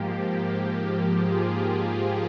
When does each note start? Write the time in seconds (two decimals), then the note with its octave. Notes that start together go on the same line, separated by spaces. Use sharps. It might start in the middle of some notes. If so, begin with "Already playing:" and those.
Already playing: G#2 F3 A#3 G4
0.36 G4
1.20 F4 G#4